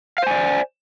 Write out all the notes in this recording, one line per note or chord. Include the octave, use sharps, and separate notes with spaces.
C5 D5 F5 G#5